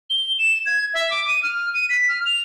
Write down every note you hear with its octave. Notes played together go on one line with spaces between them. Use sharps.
G7
E7
G#6
E5
D6
D#7
F6
D#7
B6
F6
F7